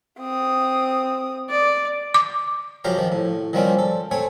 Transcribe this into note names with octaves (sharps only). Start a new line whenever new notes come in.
C4 D#6
D5
D6
F#2 C#3 F3 G4 F5 A#5
D#3 F3
A2
D#3 F3 G3 A#3 C4 C#4
A4
A3 C4 C#5 G#5